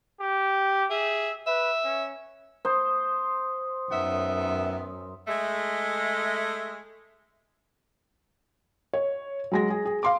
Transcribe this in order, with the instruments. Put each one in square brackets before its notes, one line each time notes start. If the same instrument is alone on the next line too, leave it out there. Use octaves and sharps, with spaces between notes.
[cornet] G4
[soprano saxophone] G#4 [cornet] E5
[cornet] B4 [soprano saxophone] E5
[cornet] C#4
[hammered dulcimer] C5 [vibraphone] D#6
[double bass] F#2 [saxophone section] D#3 B3 E5
[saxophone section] G#3 A3
[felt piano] C#5
F#3 G#3 A#6
G#4
G#4
F5 C6 D6